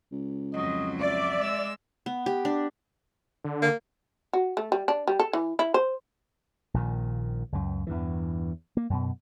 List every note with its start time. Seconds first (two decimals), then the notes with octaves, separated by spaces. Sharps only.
0.12 C#2
0.53 F2 F#3 D#5
1.01 D5 E5
1.40 G#3 E6
2.06 B3
2.26 G4
2.45 D4
3.45 D3
3.62 A#3
4.33 F#4
4.57 A3
4.72 G3
4.88 D4
5.08 G3
5.19 A4
5.33 E3
5.59 E4
5.74 C5
6.74 A#1 A#2 D#3
7.52 C#2 F#2
7.87 E2 G2 E3
8.77 A#3
8.90 F#2 B2